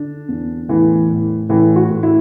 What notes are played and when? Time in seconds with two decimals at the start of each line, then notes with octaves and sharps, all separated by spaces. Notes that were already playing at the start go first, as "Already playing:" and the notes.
Already playing: D3 D4
0.29 E2
0.69 A2 E3
1.09 A2
1.49 A2 E3
1.76 F#4
1.90 A2
2.03 E4